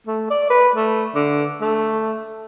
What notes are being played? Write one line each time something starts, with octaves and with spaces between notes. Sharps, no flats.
A3
D5
B4
A3
D3
A3